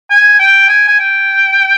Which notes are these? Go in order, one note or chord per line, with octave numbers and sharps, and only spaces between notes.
G#5
G5
G#5
G#5
G5